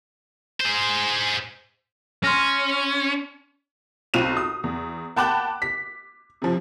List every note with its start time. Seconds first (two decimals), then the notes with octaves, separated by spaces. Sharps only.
0.61 G#4 C5
2.24 C#4 C6 F6 A#6
4.14 B1 C4 F4 D#7 F7
4.37 D#6
4.64 E2
5.16 F#5 G5 A5 B5 D6 F#6
5.62 B6
6.42 C3 F3